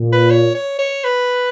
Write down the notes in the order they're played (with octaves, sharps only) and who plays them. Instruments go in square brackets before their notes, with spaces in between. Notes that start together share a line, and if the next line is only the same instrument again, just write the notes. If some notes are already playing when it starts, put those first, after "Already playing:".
Already playing: [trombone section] A#2
[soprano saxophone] B4
C#5
C#5
C#5
B4